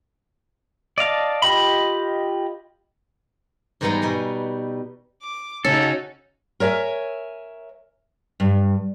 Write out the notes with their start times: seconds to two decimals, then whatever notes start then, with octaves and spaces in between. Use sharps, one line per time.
0.98 D5 D#5 F5 A5
1.42 F4 G4 D#5 B5
3.81 G#2 E3 G3 G#3 B3 D#4
4.02 B2 G3 D#4 D#5
5.23 D6
5.65 C#3 C#4 D#4 F#4 A4
6.60 A#4 C#5 E5 G#5
8.40 G2